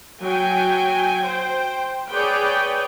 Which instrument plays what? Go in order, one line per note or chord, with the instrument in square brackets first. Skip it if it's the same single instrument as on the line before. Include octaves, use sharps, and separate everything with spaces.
[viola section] F#3 G5 G#5
C5 G5
G#4 B4 C#5 D5 G5